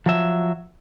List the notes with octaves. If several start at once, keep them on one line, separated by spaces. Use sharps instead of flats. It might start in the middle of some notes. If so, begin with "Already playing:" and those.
F3 F#3 E5